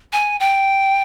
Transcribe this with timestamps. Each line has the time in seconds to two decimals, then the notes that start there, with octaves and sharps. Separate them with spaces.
0.13 G#5
0.40 G5